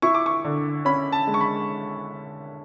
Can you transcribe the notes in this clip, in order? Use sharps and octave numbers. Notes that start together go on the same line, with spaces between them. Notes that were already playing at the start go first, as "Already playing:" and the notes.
E4 C#6
D6
C#6
D3
C#4 B5
A5
G#3
C#6
B5